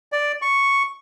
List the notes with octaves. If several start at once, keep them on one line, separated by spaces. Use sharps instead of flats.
D5
C#6